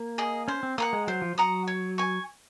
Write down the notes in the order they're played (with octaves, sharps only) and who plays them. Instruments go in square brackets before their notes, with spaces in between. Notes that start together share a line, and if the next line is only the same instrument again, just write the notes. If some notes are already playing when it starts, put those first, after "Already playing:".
Already playing: [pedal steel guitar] A#3
[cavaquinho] G#4 D#5
[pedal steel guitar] C#4 [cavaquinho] C5
[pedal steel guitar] C4
[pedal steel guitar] A#3 [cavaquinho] F#5 A#5 D#6
[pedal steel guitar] G#3
[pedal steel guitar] F#3 [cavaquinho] C5
[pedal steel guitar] F3
[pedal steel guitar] F#3 [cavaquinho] F#5 A#5 D#6
[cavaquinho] C#5
G#5 C#6